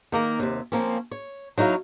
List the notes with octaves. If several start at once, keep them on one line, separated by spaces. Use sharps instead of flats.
D#3 A#3 A#4
D#2 C3
F3 A#3 C4 C#4
C#5
F#3 D#4 E4 C#5 F5